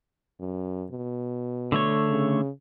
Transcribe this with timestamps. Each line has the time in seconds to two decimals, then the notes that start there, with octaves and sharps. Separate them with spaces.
0.40 F#2
0.91 B2
1.72 D3 A3 C#5
2.09 C#3